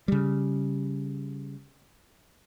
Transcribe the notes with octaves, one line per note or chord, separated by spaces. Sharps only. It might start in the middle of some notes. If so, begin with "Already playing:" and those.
C#3 G3